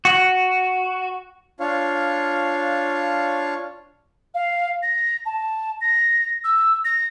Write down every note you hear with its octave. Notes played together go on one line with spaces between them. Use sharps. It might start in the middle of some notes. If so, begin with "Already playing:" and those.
F#4
D4 F4 C#5 F5
F5
A#6
A5
A#6
E6
A#6